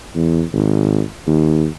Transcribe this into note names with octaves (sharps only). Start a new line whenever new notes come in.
E2
G#1
D#2